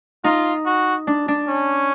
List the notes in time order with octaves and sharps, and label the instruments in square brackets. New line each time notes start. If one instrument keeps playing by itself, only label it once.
[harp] D#4 [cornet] F4
[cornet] F#4
[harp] D4
D4
[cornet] C#4